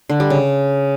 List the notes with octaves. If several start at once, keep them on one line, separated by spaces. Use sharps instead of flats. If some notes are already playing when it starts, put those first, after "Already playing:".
D3
G3
C#3